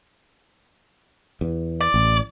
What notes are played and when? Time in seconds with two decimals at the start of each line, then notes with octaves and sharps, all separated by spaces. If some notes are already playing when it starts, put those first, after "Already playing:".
1.41 E2
1.81 D5
1.94 A1